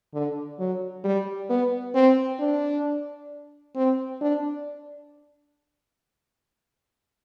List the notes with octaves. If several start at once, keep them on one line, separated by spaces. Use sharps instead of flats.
D3
F#3
G3
B3
C4
D4
C4
D4